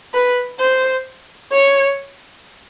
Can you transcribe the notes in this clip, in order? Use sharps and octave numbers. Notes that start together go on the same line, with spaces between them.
B4
C5
C#5